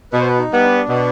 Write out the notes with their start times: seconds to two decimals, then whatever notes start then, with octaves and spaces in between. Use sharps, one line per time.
0.12 B2 B4
0.20 C5
0.28 B4
0.38 D#4
0.51 G3 B3
0.63 D4
0.89 B2